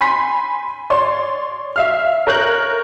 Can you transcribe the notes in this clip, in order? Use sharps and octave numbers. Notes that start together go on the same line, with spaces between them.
G#5 B5 C6 B6
C#5 D5 C6
E5 F5 F6
A#4 C#5 F#6 G6 F#7